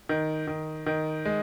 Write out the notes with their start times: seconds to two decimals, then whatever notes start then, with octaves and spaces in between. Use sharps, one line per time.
0.09 D#3
0.47 D#3
0.86 D#3
1.25 G#3